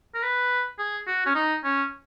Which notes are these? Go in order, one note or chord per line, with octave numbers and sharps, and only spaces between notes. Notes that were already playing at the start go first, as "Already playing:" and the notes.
A#4
B4
G#4
F#4
C#4
D#4
C#4